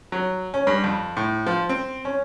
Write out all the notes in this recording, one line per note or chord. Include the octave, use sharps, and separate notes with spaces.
F#3
C#4
G2
F2
A2
F3
C4
C#4